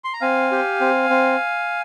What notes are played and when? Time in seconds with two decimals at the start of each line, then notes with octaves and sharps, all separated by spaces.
0.04 C6
0.13 A#5
0.21 C4 F5 G#5
0.51 G4
0.81 C4
1.10 C4